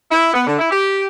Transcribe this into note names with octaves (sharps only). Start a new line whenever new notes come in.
E4
B3
D3
E4
G4